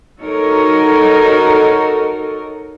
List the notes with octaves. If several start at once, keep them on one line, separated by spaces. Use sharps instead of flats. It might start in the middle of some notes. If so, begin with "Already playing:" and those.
D#4 F#4 A4 A#4 C#5